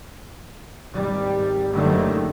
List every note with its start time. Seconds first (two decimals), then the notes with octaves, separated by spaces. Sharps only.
0.92 G#1 G3
1.73 F#1 D3 D#3 F#3 G3 A3